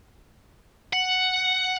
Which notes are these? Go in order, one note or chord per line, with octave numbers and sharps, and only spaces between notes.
F#5